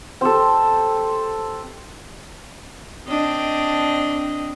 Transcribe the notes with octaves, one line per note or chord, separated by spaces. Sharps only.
C4 G4 A4
C4 D4 D#5